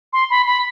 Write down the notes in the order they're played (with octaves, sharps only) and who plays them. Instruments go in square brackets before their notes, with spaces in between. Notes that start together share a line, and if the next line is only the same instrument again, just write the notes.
[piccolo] C6
B5
B5